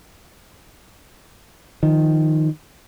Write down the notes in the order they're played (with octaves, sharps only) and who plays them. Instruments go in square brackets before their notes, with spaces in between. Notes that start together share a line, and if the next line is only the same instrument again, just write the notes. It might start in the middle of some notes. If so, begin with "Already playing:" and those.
[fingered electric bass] D#3 F3